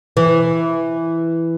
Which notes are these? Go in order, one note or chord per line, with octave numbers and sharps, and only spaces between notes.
E3